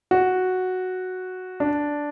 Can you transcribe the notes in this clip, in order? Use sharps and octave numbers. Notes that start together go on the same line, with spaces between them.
F#4
D4